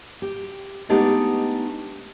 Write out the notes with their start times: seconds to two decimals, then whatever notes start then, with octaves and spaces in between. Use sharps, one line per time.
0.22 G4
0.89 G#3 A3 B3 D4 D#4 G4